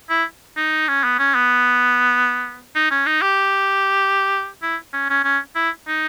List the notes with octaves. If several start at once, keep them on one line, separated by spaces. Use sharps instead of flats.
E4
D#4
C#4
B3
C#4
B3
D#4
C#4
D#4
G4
E4
C#4
C#4
C#4
E4
D#4